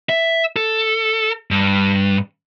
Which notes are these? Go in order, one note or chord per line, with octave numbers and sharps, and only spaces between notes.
E5
A4
G2